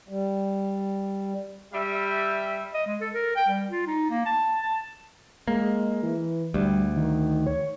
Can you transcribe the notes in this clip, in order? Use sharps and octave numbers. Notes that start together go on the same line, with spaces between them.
G3
G3 E5
D#5
G#3
A4
A#4
G5
G3
F4
D#4
A#3
A5
A5
G#3 A#3
E3
D2 G3
D#3
C#5